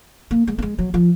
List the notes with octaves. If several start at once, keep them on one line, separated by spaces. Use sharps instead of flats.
A#3
G#3
A#3
G#3
F#3
F3